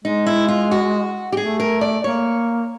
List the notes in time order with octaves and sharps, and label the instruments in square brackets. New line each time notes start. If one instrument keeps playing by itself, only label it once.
[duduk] G#3 [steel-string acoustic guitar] D#4
[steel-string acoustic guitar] E4
F4
F#4
G4
[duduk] A3 [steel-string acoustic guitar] G#4
[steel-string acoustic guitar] A#4
D5
[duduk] A#3 [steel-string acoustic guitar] C#5